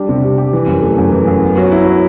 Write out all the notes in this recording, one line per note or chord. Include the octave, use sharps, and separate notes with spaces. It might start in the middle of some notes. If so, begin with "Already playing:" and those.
Already playing: G3 D4 G4
C3
G3
G4
E3
F#2
A3
F#2
E3
F#2
B3
F#3
E4
F#3